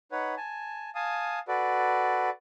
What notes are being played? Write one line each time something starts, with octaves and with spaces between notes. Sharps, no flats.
D#4 B4 C#5 F#5
G#5 A5
F5 G#5 A5 D#6
F#4 A4 B4 D5